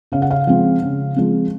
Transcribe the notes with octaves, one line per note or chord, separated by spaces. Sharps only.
C#3 F5
F#5
F5
F3 G#3 C4
C#3
F3 G#3 C4